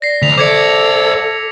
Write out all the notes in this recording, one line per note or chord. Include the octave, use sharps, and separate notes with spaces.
D5 A#6 C7
D2 B6 F7
A4 C5 D5 D6 G#6 C#7